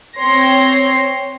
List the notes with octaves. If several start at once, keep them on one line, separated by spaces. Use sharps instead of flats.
C4 C#5 C6 A#6